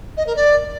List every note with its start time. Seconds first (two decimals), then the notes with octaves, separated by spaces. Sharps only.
0.17 D#5
0.27 A#4
0.36 D5